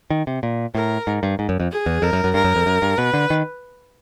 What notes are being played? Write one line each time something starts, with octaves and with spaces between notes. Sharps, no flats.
D#3
C3
A#2
A2 A#4
G#2
G2
G#2
F#2
F2
G#4
E2
F2 A#4
F#2
F#2
G2 A#4
F#2
F2
F#2
G2
B2 B4
D3
D#3